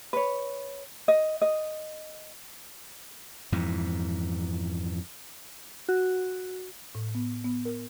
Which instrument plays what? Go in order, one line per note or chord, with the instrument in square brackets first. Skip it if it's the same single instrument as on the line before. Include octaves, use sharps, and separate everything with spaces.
[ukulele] B4 C#5
D#5
D#5
[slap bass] F2 G#2 E3
[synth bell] F#4
[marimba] A2
B3
B3
A#4